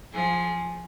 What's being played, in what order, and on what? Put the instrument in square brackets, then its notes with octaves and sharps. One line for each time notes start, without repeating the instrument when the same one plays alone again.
[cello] F3 [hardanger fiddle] G#4